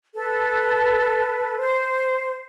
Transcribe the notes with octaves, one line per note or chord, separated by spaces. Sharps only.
A4 B4
C5